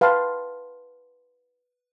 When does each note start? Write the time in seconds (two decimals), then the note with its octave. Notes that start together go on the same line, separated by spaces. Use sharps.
0.01 B4 F5 G5 A5 C6